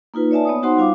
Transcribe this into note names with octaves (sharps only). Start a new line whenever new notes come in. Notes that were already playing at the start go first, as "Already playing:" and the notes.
A#3 D#4 F4 B4
C#5 D5 E5 G#5 A5
B3 C#5 D#6
D#4 F#4 C5 F#5 C6
G3 F4 F5 D6